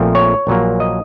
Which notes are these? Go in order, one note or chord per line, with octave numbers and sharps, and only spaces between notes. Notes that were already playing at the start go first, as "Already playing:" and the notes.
Already playing: A#1 A#2 F3 A3 C4
C#5
A#1 A#2 F#3 A#3
D#5